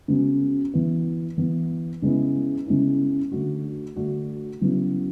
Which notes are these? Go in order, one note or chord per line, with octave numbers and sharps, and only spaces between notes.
C#3 G#3 B3 F#4
E3 B3 E4
E3 B3 E4
C#3 G#3 B3 E4
C#3 G#3 B3 E4
D3 A3 D4 F#4
D3 A3 D4 F#4
C#3 F#3 B3 E4